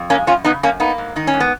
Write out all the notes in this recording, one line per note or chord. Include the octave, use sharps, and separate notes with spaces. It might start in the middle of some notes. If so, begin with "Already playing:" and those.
Already playing: F2
G#3 A#3 C#4
F#2 C#4 F4
C#3 B3 D#4
F#2 A#3 C#4
A#3 B3 D#4
G#2
D#3 D#4
C#4
G#2
B3